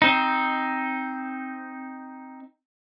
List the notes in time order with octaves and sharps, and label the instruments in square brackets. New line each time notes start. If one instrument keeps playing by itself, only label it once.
[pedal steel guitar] C4 D#4